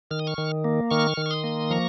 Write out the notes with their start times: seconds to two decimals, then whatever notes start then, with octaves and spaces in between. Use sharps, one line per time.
0.11 D#3 F6
0.19 D#6
0.27 C#6 F6
0.38 D#3
0.64 A#3
0.91 D#3 C#6 F6
1.17 D#3
1.26 C#6
1.31 C6 D#6
1.44 A#3
1.70 F3 A#5 C#6